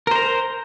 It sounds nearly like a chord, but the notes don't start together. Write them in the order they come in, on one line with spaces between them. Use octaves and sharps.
A#4 C5 A#5